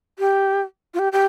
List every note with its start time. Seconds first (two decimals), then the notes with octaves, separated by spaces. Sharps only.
0.19 G4
0.94 F4
0.99 G4
1.13 G4